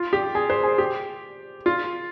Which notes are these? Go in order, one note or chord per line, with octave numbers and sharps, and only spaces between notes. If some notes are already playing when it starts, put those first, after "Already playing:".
Already playing: F4
G4
G#4
C5
G#4
G4
F4